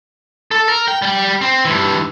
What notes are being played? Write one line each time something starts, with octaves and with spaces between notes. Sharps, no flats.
A4
A#4
G5
G3 G5
C4
G2 E3